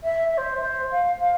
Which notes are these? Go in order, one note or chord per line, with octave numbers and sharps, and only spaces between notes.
E5
E5
C5
C5
F5
F5